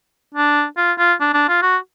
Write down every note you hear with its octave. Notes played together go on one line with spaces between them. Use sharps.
D4
F4
F4
D4
D4
F4
F#4